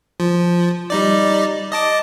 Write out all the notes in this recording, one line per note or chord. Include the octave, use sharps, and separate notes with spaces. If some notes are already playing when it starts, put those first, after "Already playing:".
F3
G3 D#4 D5
D#5 A5 D6